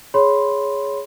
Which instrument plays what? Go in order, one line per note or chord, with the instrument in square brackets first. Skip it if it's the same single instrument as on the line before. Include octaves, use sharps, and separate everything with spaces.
[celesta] G#4 C#5 B5 C6